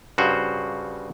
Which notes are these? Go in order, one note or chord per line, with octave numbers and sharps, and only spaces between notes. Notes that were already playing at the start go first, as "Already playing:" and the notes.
G2 C#3 F#4 C5